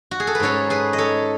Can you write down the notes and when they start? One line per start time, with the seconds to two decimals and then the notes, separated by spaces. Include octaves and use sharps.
0.11 F#4
0.20 G#4
0.27 A4
0.35 B4
0.40 G#2 F#3 C#4 A4 C#5
0.70 G#4 B4
0.93 D#5
0.98 A4 C#5